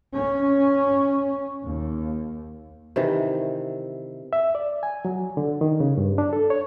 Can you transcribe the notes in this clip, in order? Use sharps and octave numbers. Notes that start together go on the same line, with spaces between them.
C#4
D#2
C3 D#3 E3
E5
D5
G#5
F#3
D3
D#3
C#3
G2
D4
A4
C#5